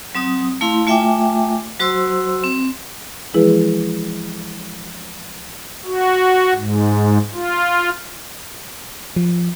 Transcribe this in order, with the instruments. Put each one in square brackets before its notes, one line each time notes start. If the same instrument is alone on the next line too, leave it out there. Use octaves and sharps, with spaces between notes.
[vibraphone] F#3 C4 D#6
A3 E4 F5 C6
A3 F4 E5 G5 G#5 D6
F#3 F#4 C5 C6 E6
C4
[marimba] E3 F3 G#3 E4 G#4 B4
[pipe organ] F#4
G#2
F4
[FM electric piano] F3